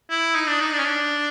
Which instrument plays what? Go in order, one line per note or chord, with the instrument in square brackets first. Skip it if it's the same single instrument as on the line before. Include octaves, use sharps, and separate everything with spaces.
[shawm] E4
D#4
D4
D#4
D4
C#4
D4